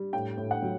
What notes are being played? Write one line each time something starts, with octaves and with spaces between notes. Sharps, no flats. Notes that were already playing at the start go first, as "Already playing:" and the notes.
Already playing: G3
A2 G5
A2
F#5
F#3